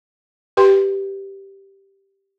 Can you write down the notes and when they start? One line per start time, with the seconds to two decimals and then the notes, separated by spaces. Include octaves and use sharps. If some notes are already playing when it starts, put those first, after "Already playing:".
0.57 G4 B4 G5 C6